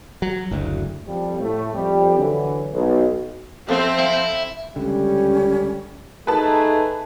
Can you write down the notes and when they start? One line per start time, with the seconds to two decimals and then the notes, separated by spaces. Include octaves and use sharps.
0.22 F#3
0.51 F#1 D2
1.07 F2 F3 G3
1.39 A2 A3
1.73 F2 G3 G4
2.17 D3 E3 F#3
2.72 B1
3.69 F2 C4 E5 F5
3.99 E4
4.76 C#2 D3 G3 C#4 G4
6.27 A3 D#4 G#4 B4 A5